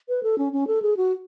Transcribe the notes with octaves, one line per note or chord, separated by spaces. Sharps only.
B4
A4
C#4
C#4
A4
G#4
F#4